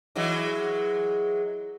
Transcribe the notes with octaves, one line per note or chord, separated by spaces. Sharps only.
E3 F#3 G#3